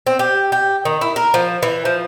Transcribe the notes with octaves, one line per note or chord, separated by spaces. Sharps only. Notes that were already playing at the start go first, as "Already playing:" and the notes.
C4
G4
G4
D#3
E4
A#4
F3
E3
F3